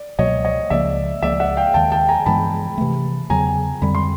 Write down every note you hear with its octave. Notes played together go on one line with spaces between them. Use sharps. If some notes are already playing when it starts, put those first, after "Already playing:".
Already playing: D5
C#2 B2 F#3 A#3 C#5 D#5
C#5 D#5
C#2 C#3 F3 A#3 D5 E5
C#2 C#3 F3 A#3 D5 E5
E5 F#5
F5 G5
D#2 D#3 G#3 G5 A5
G5 A5
G#5 A#5
G2 E3 G#3 B3 A5 B5
C3 E3 A3
E2 C#3 F#3 G#5 A#5
F2 D3 G3 B5
C6